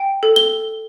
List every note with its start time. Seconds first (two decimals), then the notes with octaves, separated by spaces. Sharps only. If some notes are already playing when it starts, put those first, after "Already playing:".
Already playing: G5
0.23 A4
0.36 G7